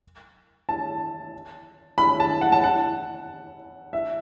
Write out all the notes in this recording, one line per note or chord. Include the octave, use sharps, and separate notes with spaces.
A5
B5
A5
F#5
A5
F#5
E5